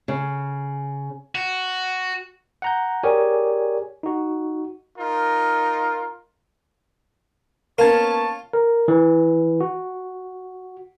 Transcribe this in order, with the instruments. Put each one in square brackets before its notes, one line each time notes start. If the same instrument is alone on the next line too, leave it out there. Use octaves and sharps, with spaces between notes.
[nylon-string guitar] C#3
[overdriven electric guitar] F#4
[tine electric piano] F#5 A#5 G6
G4 G#4 A#4 C#5 D5 G#5
D#4 F#4
[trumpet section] D#4 F4 A#4
[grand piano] A#3 B3 C#4 [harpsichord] F4 [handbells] A#4 G#6 [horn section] C#5 A5
[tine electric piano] A#4
E3
F#4